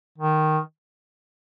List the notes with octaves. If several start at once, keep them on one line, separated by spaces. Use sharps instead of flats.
D#3